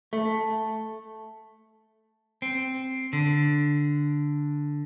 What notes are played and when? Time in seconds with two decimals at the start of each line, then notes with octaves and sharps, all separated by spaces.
0.13 A3
2.42 C4
3.13 D3